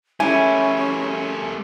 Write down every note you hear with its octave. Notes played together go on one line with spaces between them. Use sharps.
G3 A3 C#4 E4 G#5